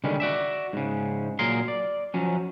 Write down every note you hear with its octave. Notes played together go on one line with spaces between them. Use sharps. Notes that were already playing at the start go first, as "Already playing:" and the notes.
D3 D#3 G3 G#3 C#4
F#4 D5 E5
G#2 C#3
A#2 F#3 A#3 G#4 A#4 C6
D5
F3 F#3 C#4